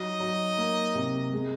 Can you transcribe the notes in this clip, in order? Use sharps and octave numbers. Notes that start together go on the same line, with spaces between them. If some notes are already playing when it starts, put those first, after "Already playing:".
Already playing: F#3 D#4 D#5
F#3
A#3
C3
G#3